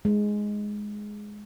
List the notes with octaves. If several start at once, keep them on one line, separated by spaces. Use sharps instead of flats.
G#3